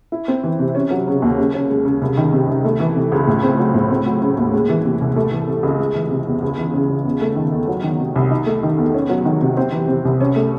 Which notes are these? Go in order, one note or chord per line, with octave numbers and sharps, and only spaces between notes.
E4
C4
E3
C3
C#4
F#3
C#3
D#2
C#3
C#4
G#3
C#3
C2
D#3
C3
C2
A3
E3
C3
C#2
A2
C4
F#3
A2
C4
F#3
C#3
D#2
G#3
E3
C3
C2
A3
E3
C3
C#2
G#3
E3
C3
E2
C#2
E3
C#3
C#2
E2
A3
D#3
E2
F#3
D#3
C3
C2
D#4
A3
D#3
E2
C#4
F#3
D#3
C3
C4
E3
C3
C2
C#4
A3